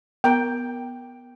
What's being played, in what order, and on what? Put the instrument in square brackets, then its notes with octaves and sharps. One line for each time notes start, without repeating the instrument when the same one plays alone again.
[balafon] B3 A#4 A#5 [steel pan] G5